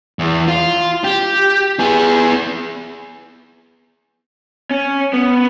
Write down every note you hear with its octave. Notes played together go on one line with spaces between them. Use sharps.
E2
F4
G4
B3 G#4
C#4
B3